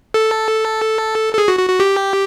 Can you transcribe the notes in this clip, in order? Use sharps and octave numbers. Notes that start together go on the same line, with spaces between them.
A4
A4
G#4
F#4
F#4
F#4
G4